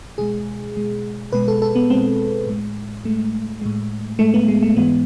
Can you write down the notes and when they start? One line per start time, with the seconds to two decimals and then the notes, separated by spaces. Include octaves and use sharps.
0.18 B2 G#3 G#4
0.76 B2 G#3
1.32 B2 G#3 B4
1.48 A4
1.62 A4
1.75 B3
1.90 B2 G#3 C4
2.47 A2 G#3
3.04 A2 G#3 A3
3.61 A2 G#3
4.19 A2 G#3 A3
4.34 B3
4.48 G#3
4.62 A3
4.76 G#2 E3 G#3 B3